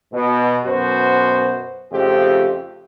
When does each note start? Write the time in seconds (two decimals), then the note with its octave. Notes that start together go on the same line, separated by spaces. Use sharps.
0.13 B2
0.65 F#2 B2 F#4 C5
1.92 F2 C#3 F3 A3 G4